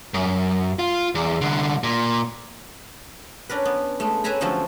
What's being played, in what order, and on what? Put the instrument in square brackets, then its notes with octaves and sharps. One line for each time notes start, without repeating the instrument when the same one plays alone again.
[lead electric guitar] F#2
F4
E2
C2 D3
A#2
[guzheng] C#4 D4 A#4 B4
B3
G#3 A3
B4 C#5 E5 G#5 A#5 B5
D3 F3 F#3 A3 C4 C#4